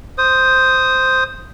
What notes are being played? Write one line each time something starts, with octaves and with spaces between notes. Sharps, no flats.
C5 D#6